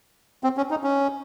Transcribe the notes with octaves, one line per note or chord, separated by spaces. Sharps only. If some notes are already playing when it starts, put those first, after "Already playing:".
C4
C#4
D#4
C#4